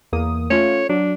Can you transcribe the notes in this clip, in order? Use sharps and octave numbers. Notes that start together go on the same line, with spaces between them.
E2 A#3 D#6
A3 C#4 F4 C#5
F#3 D4